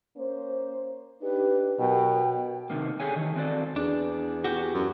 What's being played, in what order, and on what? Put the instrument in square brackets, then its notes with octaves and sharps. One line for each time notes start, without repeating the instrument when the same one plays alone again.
[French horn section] A#3 C#4 C5
[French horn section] D4 D#4 G4 [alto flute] B4
[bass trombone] B2 [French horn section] F#3 A#4 [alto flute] G5
[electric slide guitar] C3 D#3 A#3
D3 G4 G#4 C#5 G#5
D#3 E3 A3
D#3 C4 F#4 A4 D5
[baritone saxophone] E2 [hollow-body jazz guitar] D4
[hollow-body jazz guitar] F#4 G4
[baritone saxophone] F#2